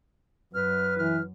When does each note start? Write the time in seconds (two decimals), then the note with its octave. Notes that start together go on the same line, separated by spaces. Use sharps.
0.54 F#2 B4 F6
0.98 E3 F6